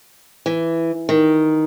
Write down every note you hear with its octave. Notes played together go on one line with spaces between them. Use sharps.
E3
D#3